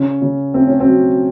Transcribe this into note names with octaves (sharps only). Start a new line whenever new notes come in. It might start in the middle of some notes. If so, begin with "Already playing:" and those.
Already playing: C#3 C#4
C#3
A3 C4
C#4
C4
F#3